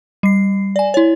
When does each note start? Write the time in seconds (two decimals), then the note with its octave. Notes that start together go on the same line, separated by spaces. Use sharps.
0.23 G3 C7
0.76 D5 G#5
0.94 E4 C#5